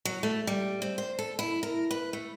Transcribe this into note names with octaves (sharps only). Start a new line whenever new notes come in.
F#3
A3
G3
C4
C5
A4
E4
A#4
B4
A3